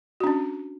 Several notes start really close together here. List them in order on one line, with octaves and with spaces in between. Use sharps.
F#4 D4 C#4